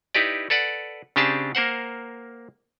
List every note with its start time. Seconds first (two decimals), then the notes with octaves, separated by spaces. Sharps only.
0.15 D#4 E4 G4 B4 D5
0.50 A4 B4 D5 F#5
1.16 C#3 C4 D4 G4 G#4 A5
1.55 A#3 A#4 C5 F#5